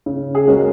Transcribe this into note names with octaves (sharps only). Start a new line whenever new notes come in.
C#3
G#4
G#3 C#4 F#4 A#4